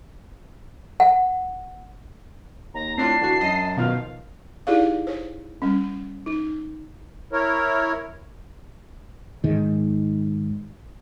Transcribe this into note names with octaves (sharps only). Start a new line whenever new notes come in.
F#5
D#2 A#5
A2 C4 D4 F4 A5 C7
D3 E3 F#4
F#2 D#5
B2 D#3 F3 F5
D#4 E4 G4 G#4 D5 F5
C5 C#5
G3 C#4
D#4
E4 A#4 C#5
G#2 D#3